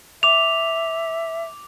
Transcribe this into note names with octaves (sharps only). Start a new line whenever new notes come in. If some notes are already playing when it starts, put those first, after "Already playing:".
E5 D6 F7